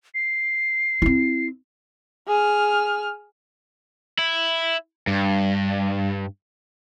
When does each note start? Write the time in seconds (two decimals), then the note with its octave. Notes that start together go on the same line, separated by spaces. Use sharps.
0.15 C7
1.02 C4 E4
2.28 G#4 F6
4.19 E4
5.07 G2